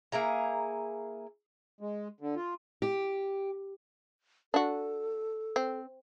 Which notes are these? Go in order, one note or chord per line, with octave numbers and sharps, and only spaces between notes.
A#3 E4 G#4 A#5
G#3
D3
F4
G4
D4 F#4 A4
C4